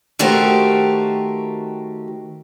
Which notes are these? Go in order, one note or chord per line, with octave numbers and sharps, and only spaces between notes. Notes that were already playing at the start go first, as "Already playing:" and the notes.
D#3 A3 F#4 G4 A#4 C5